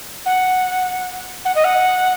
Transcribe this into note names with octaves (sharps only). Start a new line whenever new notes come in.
F#5
F#5
D#5
F#5